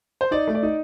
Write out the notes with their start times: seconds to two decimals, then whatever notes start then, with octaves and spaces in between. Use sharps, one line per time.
0.21 C5
0.31 D#4 D5
0.47 A3
0.55 D5
0.63 D#4